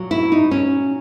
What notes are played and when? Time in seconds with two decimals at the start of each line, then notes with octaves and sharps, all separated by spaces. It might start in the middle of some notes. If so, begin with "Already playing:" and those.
Already playing: A#2 F#3
0.11 E4
0.32 D#4
0.51 C#4